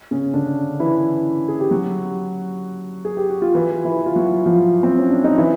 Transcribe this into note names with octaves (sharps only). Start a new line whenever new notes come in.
C#3 C#4
D3 D4
E3 E4
G#4
G4
F#3 F#4
G#4
G4
F#4
F4
E3 E4
E3 E4
F4
F#3 F#4
F3 F4
C4
C#4
D4
D#4
E3 E4